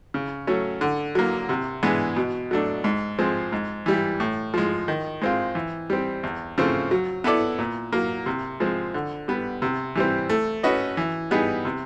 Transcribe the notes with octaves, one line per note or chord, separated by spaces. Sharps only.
C#3
F#3 A3 C#4
D3
F#3 A#3
C3
E3 G#3 B3 D4
B2
F#3 A3 D4
G#2
F3 G#3 C4
G#2
E3 G3
A2
F3 G#3
D#3
G#3 C4 F4
E3
G3 C4
E2
C#3 F3 A3 C4
F#3
B3 E4 A4 D5
A#2
F#3 A#3
C3
F3 G#3 C4
D3
G3 B3
C3
E3 G3 C4
A3
C#4 F#4 B4 D#5
E3
G3 B3 D#4 G#4
C3